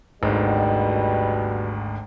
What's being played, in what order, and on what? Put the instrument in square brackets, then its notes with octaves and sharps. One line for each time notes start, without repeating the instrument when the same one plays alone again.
[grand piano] G#1 D2 G#2 [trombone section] B2 G3